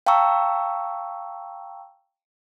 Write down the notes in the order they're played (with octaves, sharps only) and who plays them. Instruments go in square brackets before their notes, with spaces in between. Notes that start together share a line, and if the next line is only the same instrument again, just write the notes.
[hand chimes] F5 G5 A5 A#5 C#6 E6